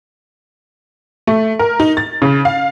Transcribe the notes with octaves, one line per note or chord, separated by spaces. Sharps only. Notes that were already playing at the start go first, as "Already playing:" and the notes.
A3
A#4
D#4
A6
C#3
F5